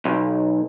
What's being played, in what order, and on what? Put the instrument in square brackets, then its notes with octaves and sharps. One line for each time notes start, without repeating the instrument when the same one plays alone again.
[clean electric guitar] B1